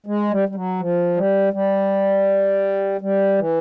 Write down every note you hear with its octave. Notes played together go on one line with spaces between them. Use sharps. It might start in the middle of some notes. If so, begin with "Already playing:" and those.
G#3
G3
G3
F#3
F3
G3
G3
G3
E3